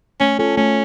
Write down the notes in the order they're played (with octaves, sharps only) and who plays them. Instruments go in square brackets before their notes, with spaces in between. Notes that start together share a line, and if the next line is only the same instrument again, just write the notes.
[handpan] A3 [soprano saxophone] C#4
[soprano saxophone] C#4 [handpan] F4 A4
[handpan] A3 [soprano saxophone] C#4